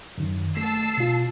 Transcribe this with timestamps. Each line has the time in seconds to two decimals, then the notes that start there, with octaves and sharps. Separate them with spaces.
0.18 F#2 D#3
0.57 A3 A5 E6 C7
0.97 B2 F4